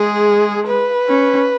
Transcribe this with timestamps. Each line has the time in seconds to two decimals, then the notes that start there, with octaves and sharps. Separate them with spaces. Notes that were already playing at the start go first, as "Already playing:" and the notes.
Already playing: G#3 G#4
0.67 B4
1.09 C#4